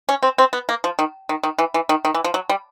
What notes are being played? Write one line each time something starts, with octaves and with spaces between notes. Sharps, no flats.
C#4
C4
C4
B3
A#3
F3
D#3
D#3
D#3
E3
E3
D#3
D#3
E3
F3
F#3
G3